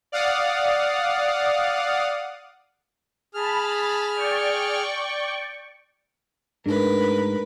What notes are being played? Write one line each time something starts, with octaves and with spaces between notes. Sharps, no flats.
D5 F5 F#5 D#6
G#4 A5 B5 F6
D5 G5 C#6
G#2 A3 D4 A#4 B4